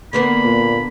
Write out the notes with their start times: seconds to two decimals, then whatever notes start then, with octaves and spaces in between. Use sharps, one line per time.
0.13 D3 A#3 B3 B5
0.44 A#2